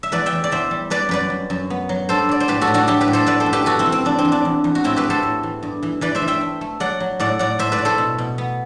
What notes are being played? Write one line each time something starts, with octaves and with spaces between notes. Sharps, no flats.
E5
E2 B4 D5
E5 G5
E2
D5
E2 C5 E5
G3
G3 B4 D5
F#2 B4 D5
F#2
F#2
B3
F#3
G2 A4 C5
F#3 D5
C5
A2 G4 B4
F#4 A4
A2
D4 F#4
F#3 E4 G4
G4 B4
A2
A4 C5
B3 B4 D5
A4 C5
F#2
G4 B4
B3 F#4 A4
C4 E4
E3
C4
E2 D4
C4
E2
D4
E2
E2
F#4
A2 C4 E4
G4 B4
B3
A4 C5
A2
E3
G2
E3
E3 B4 D5
C5 E5
E3
E5 G5
A3
A3
F#3 D5 F#5
F#3
A2 D5 F#5
A2 D5 F#5
A2 C5 E5
B4 D5
A2
A4 C5
B2
B2
B3